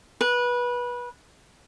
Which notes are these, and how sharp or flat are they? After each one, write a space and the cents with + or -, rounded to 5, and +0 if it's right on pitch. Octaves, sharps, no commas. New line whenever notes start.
B4 -20